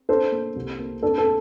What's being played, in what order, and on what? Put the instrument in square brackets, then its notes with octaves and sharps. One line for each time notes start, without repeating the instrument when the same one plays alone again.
[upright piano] D4 A4 C5
A#3
C2
A#3
D4 A4
A4